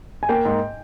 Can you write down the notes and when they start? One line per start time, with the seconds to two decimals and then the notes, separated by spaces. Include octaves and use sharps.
0.23 G#5
0.29 A#3 G5
0.45 G#2